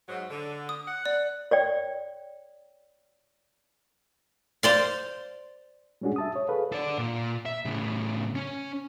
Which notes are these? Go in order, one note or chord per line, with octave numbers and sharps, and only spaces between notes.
G#2 F#3
D3
D#6
F#5
D5
C#5 D5 G5
C5 D5 F5
G3 G#3 C#4 D4 F#4 G#4
E5 A5 D#6
C#5
G#4 A4 B4 F5
A4 D5
A#2
E5
A2 C#3
C#4 C#5